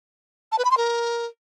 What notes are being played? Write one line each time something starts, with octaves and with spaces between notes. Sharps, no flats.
A5
B4
B5
C6
A#4